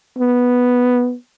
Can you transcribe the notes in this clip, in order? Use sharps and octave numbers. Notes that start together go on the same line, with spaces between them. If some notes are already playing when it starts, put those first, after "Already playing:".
B3